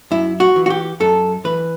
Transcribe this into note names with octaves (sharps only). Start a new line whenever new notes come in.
F#2 E4
F#4
E3
F#4
G4
F#2 A4
E3 B4